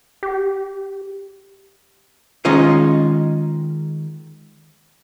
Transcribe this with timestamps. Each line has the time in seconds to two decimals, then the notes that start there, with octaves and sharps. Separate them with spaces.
0.23 G4
2.45 D#3 G#3 C#4 D#4 F4 D#5